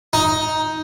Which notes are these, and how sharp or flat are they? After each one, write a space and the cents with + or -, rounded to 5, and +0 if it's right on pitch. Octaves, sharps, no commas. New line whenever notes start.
D#4 +10